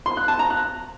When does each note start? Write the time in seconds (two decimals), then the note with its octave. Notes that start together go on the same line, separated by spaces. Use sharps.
0.06 C6
0.17 F#6
0.28 A5
0.39 A#5
0.50 F#6